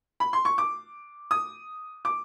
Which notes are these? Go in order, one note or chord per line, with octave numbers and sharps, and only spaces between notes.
B5
C6
C#6
D6
D#6
D6